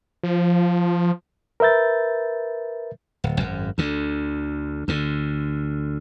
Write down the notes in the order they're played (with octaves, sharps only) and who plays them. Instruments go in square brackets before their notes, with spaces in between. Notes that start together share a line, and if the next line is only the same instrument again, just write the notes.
[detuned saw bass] F3
[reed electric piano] A#4 B4 E5 G6 A6
[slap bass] D1
G#1 F#2
D2 D3
D2 D3